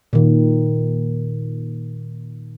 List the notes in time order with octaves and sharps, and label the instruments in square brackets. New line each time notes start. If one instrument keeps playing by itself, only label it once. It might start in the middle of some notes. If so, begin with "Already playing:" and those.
[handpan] A#2 D#3